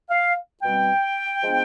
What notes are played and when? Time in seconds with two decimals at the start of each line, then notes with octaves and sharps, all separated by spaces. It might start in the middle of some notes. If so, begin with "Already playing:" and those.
0.10 F5
0.63 B2 G3 C4 G5
1.42 F3 G#3 B3 D4